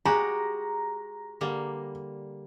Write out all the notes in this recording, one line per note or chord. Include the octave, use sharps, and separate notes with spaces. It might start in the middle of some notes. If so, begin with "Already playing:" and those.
G#3 F#4 G4 A#5
D3 G3 A#3